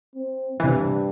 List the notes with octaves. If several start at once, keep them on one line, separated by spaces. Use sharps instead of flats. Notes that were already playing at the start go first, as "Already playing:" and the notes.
C4
G2 C3 E3